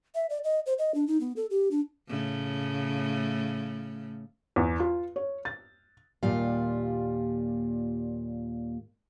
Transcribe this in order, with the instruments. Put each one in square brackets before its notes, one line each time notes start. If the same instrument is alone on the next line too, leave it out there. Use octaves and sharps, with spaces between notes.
[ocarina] E5
D5
D#5
C5
D#5
D4
D#4
B3
A4
G4
D4
[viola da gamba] A2 C#3 A3
[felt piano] E2
F4
C#5
A6
[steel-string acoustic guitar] D#2 A#2 G3 F4 F5